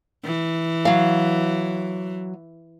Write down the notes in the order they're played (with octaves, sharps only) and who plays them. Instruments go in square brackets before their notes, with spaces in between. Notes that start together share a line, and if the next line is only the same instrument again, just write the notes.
[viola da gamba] E3
[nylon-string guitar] F#3 F5